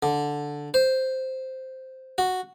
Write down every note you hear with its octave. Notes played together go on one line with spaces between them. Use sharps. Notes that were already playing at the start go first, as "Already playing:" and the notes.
D3
C5
F#4